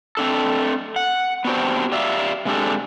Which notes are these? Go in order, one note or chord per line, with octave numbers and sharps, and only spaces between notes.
A3 C4 D4 A4
F#5
B3 C4 D4 F#4 G4 C5
G4 D5 E5 F5
C3 G#3 D4 G4 A4